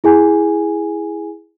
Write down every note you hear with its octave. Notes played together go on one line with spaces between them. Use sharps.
E4 G#4 G#5